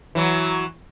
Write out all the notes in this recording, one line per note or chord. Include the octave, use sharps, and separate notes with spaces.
E3 F#3